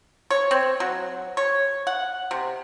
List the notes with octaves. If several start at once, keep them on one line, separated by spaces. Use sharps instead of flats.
C#5
C4
F#3
C#5
F#5
C3